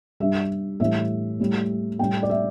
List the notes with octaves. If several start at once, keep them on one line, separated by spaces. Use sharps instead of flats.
G2 G3 E5
A2 E3 G3 E5
A2 G3
A2 G3 G5
D5
E5